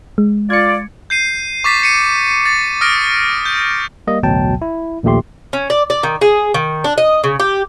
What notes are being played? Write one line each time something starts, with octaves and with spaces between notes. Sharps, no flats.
G#3
F4 D5 G#6 C#7
G6 C7 D#7
C#6 D6 A6 B6
B6 C#7 D#7
A6
D#6 F6 A#6 D7
G6
G3 A#3 D#5
A1 D2 B2 F#3 G5 A5
E4
A#1 D#2 A#2 A3 G4 C6
C#4
D5
D5
D#3
G#4
D#3
D4
D#5
C#3
G4